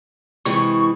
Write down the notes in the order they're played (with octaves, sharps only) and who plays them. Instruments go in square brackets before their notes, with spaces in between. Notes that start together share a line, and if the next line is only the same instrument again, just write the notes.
[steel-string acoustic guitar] C3 E3 G#3 [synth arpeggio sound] C#6